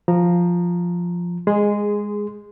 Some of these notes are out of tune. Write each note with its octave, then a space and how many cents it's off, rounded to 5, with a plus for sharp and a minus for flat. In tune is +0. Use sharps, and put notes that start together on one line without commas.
F3 +0 A#5 +0
G#3 -15 G#4 +0 C6 -20